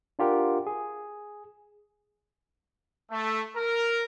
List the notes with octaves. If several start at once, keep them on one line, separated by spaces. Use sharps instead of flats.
D4 F4 G4 A#4 F#5
G#4
A3
A#4